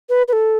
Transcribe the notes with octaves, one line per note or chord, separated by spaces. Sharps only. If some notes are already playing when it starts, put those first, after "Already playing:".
B4
B4
A4